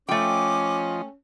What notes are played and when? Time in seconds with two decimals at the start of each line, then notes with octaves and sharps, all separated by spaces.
0.09 F3 A3 C#4 F4 D#5 G5 D6